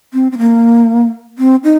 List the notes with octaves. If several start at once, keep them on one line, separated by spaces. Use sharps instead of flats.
C4
C4
A#3
C4
D#4